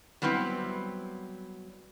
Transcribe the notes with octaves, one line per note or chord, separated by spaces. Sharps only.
F#3 G3 B3 C4 E4